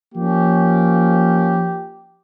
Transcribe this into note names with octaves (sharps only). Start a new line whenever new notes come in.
F3 A#3 C#4 G4